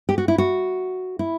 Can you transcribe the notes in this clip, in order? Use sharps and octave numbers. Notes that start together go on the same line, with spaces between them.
G4
F#4
E4
F#4
E4